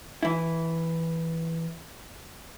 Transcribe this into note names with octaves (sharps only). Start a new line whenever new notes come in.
E3 E4